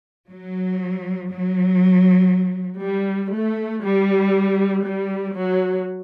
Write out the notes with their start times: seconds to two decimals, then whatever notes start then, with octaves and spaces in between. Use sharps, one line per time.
0.29 F#3
1.30 F#3
2.82 G3
3.34 A3
3.84 G3
4.86 G3
5.36 F#3